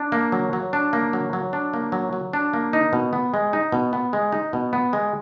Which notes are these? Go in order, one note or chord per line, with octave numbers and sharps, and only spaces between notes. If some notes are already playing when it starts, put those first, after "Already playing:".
Already playing: D4
A#3
F#3
F#3
D4
A#3
F#3
F#3
D4
A#3
F#3
F#3
D4
A#3
D#4
B2
B3
G#3
D#4
B2
B3
G#3
D#4
B2
B3
G#3